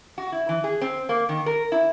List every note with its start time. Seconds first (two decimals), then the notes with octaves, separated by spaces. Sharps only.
0.18 F#4
0.32 E4
0.49 E3
0.64 G#4
0.81 C4
1.09 A#3
1.29 D#3
1.46 A#4
1.72 E4